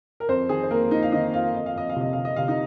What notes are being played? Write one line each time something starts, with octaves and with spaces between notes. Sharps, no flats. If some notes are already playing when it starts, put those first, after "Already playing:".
A#4
F2 C4 C5
D#3 G#4
C5
F2 A#3 A#4
F2 D#4 D#5
F5
D#3 D#4 D#5
F2 F4 F5
F2 D#5
F5
F2 D#5
F5
C3 D#5
C3 F5
D#5
C3 F5
D#4 D#5